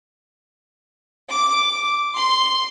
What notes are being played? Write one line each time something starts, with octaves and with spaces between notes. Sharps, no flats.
D6
C6